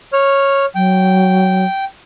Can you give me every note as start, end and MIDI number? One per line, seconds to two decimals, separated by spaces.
0.13 0.65 73
0.13 0.65 89
0.75 1.65 54
0.75 1.85 79